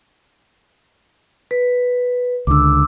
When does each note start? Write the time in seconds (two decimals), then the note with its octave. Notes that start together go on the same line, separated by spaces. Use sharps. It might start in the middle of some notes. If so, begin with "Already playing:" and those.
1.51 B4
2.47 C#2 D3 D6 E6